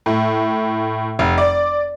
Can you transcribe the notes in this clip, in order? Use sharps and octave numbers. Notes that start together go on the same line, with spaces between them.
A2
F1
D5